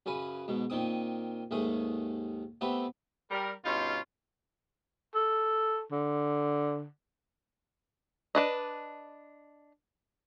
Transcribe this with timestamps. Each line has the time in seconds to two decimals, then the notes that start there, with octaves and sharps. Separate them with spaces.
0.06 F#2 C#3 B4 G#5
0.48 G#2 B2
0.70 A#2 D#3 C4 D#6
1.51 D#2 G#2 A3 G#4
2.61 A3 B3 C4 G4 B4 E5
3.31 G3 A#4
3.65 G2 B2 C#4 D#4 F4
5.15 A4
5.92 D3
8.35 D4 B4 D#5